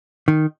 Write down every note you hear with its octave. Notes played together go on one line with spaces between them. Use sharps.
D#3